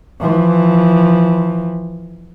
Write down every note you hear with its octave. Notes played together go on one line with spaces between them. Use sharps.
E3 F3